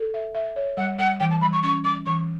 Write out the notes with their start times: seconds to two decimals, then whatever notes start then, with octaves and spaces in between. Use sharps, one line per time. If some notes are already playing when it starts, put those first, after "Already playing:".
Already playing: A4
0.14 E5
0.35 E5
0.56 C#5
0.77 G3 F#5
0.98 G3 F#5
1.20 E3 G5
1.31 A5
1.41 G3 B5
1.53 C#6
1.63 C#4 C#6
1.84 G3 D6
2.06 E3 C#6